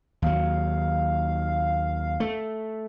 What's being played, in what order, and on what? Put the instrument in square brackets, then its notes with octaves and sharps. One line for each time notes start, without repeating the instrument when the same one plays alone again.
[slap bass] D#2 F#3 [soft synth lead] F5
[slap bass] A3